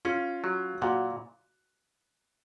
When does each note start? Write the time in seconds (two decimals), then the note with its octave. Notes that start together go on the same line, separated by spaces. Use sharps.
0.05 C#4 F4
0.44 F#3
0.81 A#2 F#4